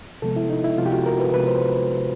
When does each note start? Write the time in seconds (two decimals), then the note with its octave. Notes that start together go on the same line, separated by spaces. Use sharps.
0.22 C3 F3 G#3 B3 A4
0.36 E4
0.50 D#4
0.64 E4
0.78 C3 F3 G#3 B3 F4
0.86 G4
0.91 F#4
1.06 A#4
1.20 B4
1.33 C3 F3 G#3 B3 B4
1.47 C5